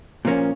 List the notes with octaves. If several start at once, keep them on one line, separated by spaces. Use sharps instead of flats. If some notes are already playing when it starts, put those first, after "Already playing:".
A#2 F3 A#3 C#4